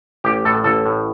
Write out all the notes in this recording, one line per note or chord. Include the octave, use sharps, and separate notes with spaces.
A1 G4
A2 A4
A1 A4
A2